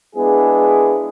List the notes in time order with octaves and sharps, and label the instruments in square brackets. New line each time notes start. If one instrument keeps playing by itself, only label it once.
[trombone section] G#3 B3 D4 E4 G#4